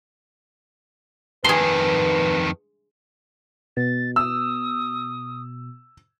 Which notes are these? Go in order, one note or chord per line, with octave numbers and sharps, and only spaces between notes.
F2 D#3 G#4 B4 C6
B2 A6
D#6 E6